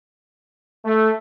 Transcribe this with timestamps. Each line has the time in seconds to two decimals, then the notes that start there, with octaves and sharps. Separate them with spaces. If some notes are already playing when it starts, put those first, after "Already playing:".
0.85 A3